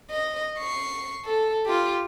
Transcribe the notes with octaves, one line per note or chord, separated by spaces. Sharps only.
D#5
C#6 C7
A4
F4 G4